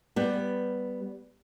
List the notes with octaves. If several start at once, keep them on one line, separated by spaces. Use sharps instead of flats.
G3 B3